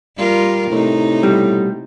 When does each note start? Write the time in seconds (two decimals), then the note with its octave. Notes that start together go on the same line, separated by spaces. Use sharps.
0.17 G3 F4 A#4
0.72 A2 C3 D#4
1.23 B2 G3